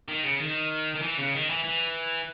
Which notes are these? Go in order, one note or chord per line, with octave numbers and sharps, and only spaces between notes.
D#3
C#3
D#3
D#3
E3
C#3
D#3
E3
E3